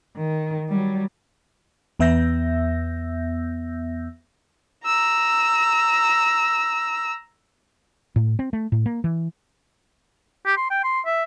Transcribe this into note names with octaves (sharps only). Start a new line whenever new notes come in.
D#3
F#3 G3
E2 B3 E5 E6 G6 A#6
A#5 E6
A2
C4
A3
A2
A#3
E3
G4
C6
G5
C6
E5